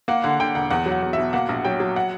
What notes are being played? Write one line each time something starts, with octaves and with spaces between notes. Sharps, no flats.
A#3 F#5
D3 F#5
D3 G5
E1 F#5
E2 F#5
F#3
F#5
E2
B2 E5
A#3 F#5
A#1
F#3 G5
F#3
F#5